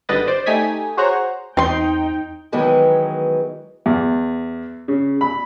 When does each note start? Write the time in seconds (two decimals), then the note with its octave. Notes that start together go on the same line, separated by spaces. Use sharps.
0.09 G#1 D3 G3 B4 D#5 A6
0.27 C5 D5
0.46 A3 D#4 G4 G#5 D#6 B6
0.97 F#4 G#4 C5 C#5 F#5 A#5
1.57 E2 C4 D#4 G5 C6
2.52 D#3 E3 F#3 G#3 B3 D#4
3.86 E2
4.88 C#3
5.21 B5